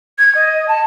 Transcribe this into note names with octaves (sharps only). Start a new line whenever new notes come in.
G#6
D#5
A5